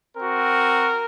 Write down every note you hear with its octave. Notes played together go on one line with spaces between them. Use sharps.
C4 F#4 A#4